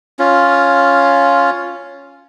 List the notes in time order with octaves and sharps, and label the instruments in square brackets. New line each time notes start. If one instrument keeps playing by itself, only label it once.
[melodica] C#4 F4